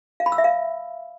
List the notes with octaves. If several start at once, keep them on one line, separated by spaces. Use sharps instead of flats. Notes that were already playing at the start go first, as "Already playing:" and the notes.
F5
B5
E6
E5
F5